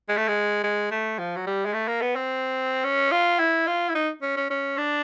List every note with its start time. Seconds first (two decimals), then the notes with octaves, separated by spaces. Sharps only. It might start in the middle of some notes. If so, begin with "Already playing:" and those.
0.09 G#3
0.17 A3
0.28 G#3
0.63 G#3
0.91 A3
1.19 F3
1.36 F#3
1.47 G3
1.66 G#3
1.74 A3
1.88 A#3
2.01 B3
2.16 C4
2.85 C#4
3.11 F4
3.39 E4
3.67 F4
3.89 E4
3.95 D#4
4.22 C#4
4.37 C#4
4.50 C#4
4.78 D4